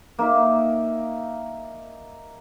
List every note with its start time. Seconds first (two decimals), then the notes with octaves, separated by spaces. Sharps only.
0.19 A#3 D#4 E5